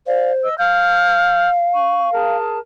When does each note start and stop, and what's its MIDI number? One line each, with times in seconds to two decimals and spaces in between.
0.07 0.49 72
0.07 0.32 74
0.07 0.32 77
0.43 0.57 75
0.43 0.57 88
0.59 2.36 77
0.59 1.48 89
0.59 1.48 91
1.73 2.12 85
2.12 2.59 68
2.12 2.59 70
2.12 2.59 81